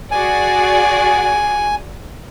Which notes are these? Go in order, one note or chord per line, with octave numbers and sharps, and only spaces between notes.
F#4 G#4 D5 G#5